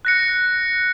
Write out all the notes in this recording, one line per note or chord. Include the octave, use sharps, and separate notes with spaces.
F#6 A#6 C#7